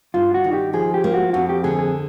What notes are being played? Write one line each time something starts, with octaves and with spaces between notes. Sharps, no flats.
G2 F4
F#4
D#3
G4
F3 G#4
G4
A#3
F#4
F2 F#4
G4
D3 G#4
G#4